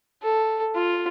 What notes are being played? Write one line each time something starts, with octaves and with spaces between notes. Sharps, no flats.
A4
F4